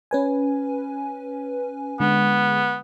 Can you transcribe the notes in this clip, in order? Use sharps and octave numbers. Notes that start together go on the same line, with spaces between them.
C#4 B4 G#5
D3 G#3 B3